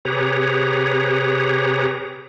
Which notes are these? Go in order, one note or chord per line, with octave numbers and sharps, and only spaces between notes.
C3 G4 G#4 B4 C#5 A#5